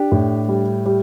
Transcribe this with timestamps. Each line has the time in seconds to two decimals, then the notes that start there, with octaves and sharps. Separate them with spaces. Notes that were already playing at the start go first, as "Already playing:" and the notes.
Already playing: D4 G4
0.12 A2
0.48 G3
0.86 G3